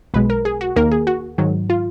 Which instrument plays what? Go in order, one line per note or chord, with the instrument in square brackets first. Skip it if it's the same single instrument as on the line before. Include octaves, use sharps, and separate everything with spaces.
[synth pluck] B1 B2 G#3 B4
A#4
G#4
F#4
D#2 D#3 A#3 A#4
G#4
F#4
G#2 D#3 F#3
F4